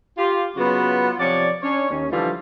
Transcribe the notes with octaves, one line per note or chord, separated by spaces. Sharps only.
F4 G4
C#3 F#3 B3 F4 F#4 B4
C3 F3 C#5 D5
C#4 D4 C#5
D#2 C#4
D3 E3 F3 G3 E4 F4